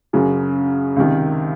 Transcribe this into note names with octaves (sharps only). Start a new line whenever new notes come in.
F#2 C#3 F#3
C#2 C3 D#3